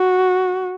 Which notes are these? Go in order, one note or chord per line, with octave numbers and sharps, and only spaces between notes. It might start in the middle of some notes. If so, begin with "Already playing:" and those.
Already playing: F#4